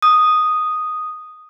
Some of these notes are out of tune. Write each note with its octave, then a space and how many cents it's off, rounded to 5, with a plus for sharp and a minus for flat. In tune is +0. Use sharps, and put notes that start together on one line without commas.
D#6 -5